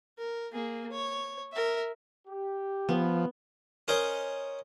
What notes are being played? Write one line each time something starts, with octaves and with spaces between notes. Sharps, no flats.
A#4
A#3 G#4
C#5
A#4 E5
G4
F3 B3
C#4 A#4 C5 C#5 D#5